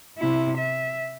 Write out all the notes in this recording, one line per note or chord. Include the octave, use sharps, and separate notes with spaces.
C3 E4
E5